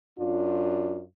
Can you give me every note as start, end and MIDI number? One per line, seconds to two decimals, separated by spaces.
0.19 1.01 42
0.19 1.01 62
0.19 1.01 65